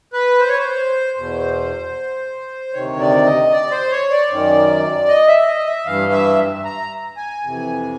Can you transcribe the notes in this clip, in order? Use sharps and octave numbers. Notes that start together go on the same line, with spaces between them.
B4
C5
C#5
C5
E2 B2
D2 C3 D#3 C#5
D5
D#5
D5
C5
C#5
D5
F#2 D#3
D#5
E5
D#5
E5
G2 E3 F5
E5
A#5
G#5
F2 C3 E3